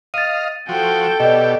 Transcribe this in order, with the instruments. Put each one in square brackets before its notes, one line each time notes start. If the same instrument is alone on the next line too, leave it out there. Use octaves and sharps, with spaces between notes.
[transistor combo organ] D#5 F5 [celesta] A6 D#7
[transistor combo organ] F3 F#4 [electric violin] A4 G5
[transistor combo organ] B2 G4 [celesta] D5 D#5